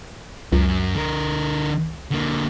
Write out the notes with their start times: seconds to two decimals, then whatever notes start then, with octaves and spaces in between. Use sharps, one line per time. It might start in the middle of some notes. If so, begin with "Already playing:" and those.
0.52 C#2 F#2
0.95 D3 A#4
2.11 D3 A#3